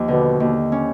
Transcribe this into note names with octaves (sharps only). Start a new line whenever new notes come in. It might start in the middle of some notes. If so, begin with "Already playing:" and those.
Already playing: D#2 F3
B2 D3
D#2
C#4